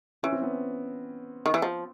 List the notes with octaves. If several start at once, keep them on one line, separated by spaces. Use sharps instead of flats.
E3 C#4
C4
B3 C#4
D#3
E3
F3